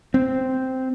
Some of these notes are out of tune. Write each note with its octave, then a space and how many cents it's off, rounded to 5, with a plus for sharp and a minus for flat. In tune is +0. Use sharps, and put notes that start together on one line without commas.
C4 -5